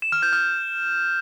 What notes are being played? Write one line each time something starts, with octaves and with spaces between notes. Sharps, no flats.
E7
F6
G6
F6